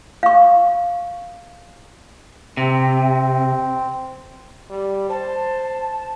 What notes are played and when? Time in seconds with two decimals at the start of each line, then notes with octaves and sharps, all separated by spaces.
0.23 F5 C#6
2.57 C3 C4
4.70 G3
5.10 C5 A5